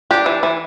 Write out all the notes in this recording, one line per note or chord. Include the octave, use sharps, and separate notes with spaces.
D4 G4
E3
E3